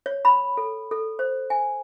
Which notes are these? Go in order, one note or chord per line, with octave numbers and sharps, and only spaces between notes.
C#5
B5
A4
A4
C5
G#5